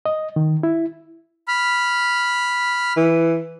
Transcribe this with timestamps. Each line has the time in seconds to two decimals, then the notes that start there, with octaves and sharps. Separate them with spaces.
0.06 D#5
0.36 D#3
0.63 E4
1.48 B5 F6
2.97 E3